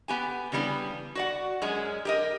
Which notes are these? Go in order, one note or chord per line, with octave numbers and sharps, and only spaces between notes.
B3 G4 G#5
C#3 E3 G3 B3 D4
F#4 D5 F#5
F#2 G#3 C#4
G4 A#4 D#5